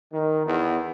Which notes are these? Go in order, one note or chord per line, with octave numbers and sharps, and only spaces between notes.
D#3
E2